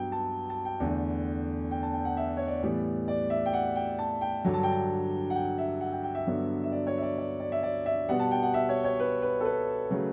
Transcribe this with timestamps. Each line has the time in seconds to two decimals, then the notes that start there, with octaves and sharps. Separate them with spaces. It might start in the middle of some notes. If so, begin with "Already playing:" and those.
Already playing: G2 F#3 B3 G5
0.12 A5
0.50 A5
0.65 G5
0.80 E2 D3 A3
1.71 G5
1.83 A5
1.94 G5
2.05 F#5
2.17 E5
2.37 C#5
2.47 D5
2.62 A2 E3 G3 B3
3.08 D5
3.30 E5
3.46 G5
3.53 F#5
3.76 G5
3.99 A5
4.21 G5
4.45 G2 D3 F#3
4.54 A5
4.63 G5
4.72 A5
5.30 F#5
5.35 G5
5.58 E5
5.81 F#5
5.92 G5
6.03 G5
6.15 E5
6.26 G2 D3 F#3 B3
6.63 E5
6.72 D5
6.87 C#5
6.97 E5
7.02 D5
7.18 D5
7.40 D5
7.52 E5
7.63 D5
7.86 E5
8.09 B2 G3 B3 F#5
8.20 A5
8.31 G5
8.43 F#5
8.54 E5
8.69 C#5
8.84 C#5
9.00 B4
9.22 B4
9.40 A4
9.45 B4
9.91 C#3 F#3 A3